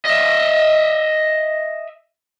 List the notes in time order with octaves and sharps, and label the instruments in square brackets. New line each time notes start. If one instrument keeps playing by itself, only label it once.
[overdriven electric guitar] D#5 E5